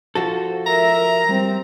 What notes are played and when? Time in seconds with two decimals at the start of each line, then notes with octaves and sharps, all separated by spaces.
0.15 F3 F#4 A4
0.66 A#4 E5 A#5
1.29 G3 C4